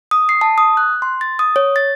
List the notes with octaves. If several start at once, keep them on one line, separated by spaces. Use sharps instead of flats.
D#6
C7
A5
D#6
F#6
C6
A6
D#6
C#5
A6